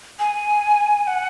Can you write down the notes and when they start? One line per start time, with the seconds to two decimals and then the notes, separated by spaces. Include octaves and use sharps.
0.20 G#5
1.07 F#5